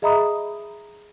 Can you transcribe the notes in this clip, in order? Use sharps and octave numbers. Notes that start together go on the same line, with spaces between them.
G#4 D#5 E5 A#5 B5 D#6